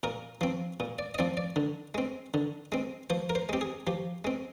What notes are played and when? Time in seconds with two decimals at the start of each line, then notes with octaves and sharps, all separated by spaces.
0.03 A#2 A#4
0.41 F3 C4
0.80 A#2
0.99 D5
1.14 D#5
1.18 F3 C4 D5
1.37 D5
1.56 D3
1.94 G#3 C4
2.34 D3
2.72 G#3 C4
3.10 F3 C5
3.30 A#4
3.35 C5
3.49 G#3 C4 G4
3.61 G#4
3.87 F3 G4
4.25 G#3 C4